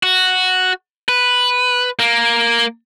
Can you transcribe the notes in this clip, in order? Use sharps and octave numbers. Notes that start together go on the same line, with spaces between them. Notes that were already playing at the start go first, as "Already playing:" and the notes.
F#4
B4
A#3